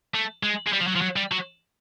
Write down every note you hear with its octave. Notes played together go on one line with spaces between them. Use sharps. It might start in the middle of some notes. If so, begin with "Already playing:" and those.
A3
G#3
G#3
G3
F3
F#3
F3
F#3
G3
F#3